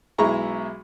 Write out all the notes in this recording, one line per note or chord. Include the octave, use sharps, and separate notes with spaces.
B1 G#3 E4 A#5 C#6